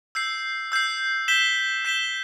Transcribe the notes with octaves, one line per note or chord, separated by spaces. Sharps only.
E6 G6 C7
E6 G6 C7
G6 B6 E7 G7
G6 B6 E7 G7